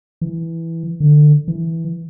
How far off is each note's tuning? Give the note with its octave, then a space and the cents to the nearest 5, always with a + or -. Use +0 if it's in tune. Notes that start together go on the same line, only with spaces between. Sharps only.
E3 +0
D3 +20
E3 -5